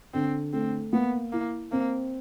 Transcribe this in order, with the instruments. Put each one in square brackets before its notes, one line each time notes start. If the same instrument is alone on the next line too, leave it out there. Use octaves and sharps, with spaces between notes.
[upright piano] D3 [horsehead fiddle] C4
[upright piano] A3 [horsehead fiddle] C4
[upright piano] A#3 [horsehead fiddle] B3
[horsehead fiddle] A#3 [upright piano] E4
[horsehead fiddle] A#3 [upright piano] C4